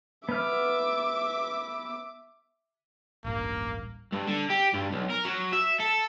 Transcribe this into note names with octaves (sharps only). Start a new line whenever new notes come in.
B3 E5 D6 F6
D1 A1 G2 A#3
G2
D3
G4
G2
B1
A#4
F#3
E5
A4